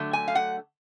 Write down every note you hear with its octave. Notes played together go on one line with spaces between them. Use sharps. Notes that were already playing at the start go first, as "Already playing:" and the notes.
Already playing: D3 F#3 A3
G#5
F5
F#5